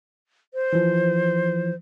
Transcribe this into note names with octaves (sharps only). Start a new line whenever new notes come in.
C5
E3 F3